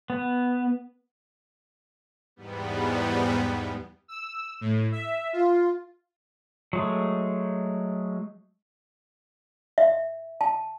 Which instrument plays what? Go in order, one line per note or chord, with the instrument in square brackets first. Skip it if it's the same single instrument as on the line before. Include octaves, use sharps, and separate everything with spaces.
[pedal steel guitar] B3
[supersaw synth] E2 G#2 G3 B3
E6
A2
E5
F4
[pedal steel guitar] F#3 G#3 A3
[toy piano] E5
A5